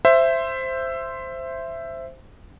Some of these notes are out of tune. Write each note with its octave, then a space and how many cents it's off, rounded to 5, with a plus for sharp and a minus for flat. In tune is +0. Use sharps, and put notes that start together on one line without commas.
C5 +0 E5 +15